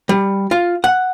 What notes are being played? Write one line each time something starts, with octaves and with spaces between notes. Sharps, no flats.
G3
F4
F#5